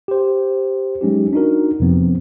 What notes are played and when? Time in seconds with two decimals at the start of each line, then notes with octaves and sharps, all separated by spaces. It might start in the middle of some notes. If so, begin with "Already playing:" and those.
0.08 G4 C5
1.01 F#3 G#3 C#4 D#4 G4
1.33 D4 D#4 F#4 A#4
1.80 F2 C3 F3 B3 C4